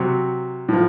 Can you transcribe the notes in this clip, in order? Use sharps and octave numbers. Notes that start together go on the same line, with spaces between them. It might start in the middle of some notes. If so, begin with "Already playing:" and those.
Already playing: C3 F#3
A2 F3